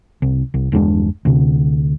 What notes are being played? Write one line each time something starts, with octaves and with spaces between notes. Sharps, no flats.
C2
C2
G1 E2 G#3 D4
D2 C3